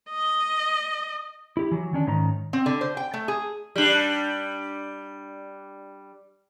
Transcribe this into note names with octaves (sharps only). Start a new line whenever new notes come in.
D#5
E4 G4
E3 F#3
D#3 C#4 D4
G#2 D#3 C#4 A#5
C4
D3
C5
G5
A3
G#4
G3 D4